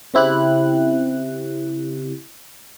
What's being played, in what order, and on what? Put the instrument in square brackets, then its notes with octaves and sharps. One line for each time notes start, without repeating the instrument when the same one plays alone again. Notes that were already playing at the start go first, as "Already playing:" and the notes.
[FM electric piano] C#3 C4 E4 G4 F#6